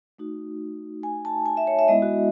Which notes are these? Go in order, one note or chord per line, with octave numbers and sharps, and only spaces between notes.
A3 D#4 F#4
G#5
A5
G#5
E5
C#5
E5
G#3 B3 E4 D#5
F#4